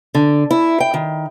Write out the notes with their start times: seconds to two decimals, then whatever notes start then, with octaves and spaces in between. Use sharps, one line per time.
0.15 D3
0.51 E4
0.80 G5
0.94 D#3